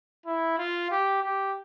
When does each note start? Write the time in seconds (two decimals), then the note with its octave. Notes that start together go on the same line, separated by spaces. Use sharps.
0.26 E4
0.58 F4
0.90 G4
1.23 G4